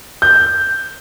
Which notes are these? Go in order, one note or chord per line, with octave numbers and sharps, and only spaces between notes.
G6